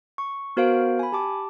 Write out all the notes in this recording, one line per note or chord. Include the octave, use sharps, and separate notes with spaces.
C#6
B3 F#4 A#4 C5 F5 D7
G#5 B5
G4 A5 D6